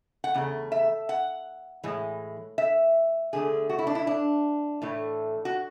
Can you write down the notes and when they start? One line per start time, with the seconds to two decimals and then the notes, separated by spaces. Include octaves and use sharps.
0.24 F#5
0.34 E2 C#3 A3
0.72 E5
1.09 F#5
1.83 A2 E3 G#3
2.58 E5
3.33 E2 D3 A3 G#4
3.70 F#4
3.79 E4
3.87 D4
3.95 E4
4.07 D4
4.82 A2 E3 A3
5.45 F#4